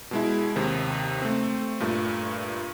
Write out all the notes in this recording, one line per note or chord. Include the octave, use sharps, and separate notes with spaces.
B2 G#3 E4
D#2 C3 D#3
A3 C4
G2 A#2 A3